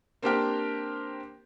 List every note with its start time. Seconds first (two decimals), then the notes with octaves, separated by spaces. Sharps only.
0.22 A#3 C4 D4 G4 A#4 G5